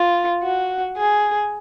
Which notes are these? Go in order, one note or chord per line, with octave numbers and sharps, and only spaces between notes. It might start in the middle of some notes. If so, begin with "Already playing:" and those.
Already playing: F4
F#4
G#4